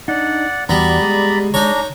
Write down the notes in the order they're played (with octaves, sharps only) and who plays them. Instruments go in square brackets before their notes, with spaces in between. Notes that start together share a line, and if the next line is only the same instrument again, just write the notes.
[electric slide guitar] D4 D#4 [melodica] D5 F#5
[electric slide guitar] E2 F#4 [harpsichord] G3 B3 [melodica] D5 A#5 B5
[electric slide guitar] G#3
[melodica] D4 A#5 [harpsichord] D#4 C#5